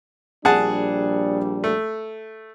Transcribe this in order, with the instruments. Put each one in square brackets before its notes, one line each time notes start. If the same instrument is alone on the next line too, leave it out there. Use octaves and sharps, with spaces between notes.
[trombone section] A#1 G3 D4 [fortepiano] G#4 F#5 A5
[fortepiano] A3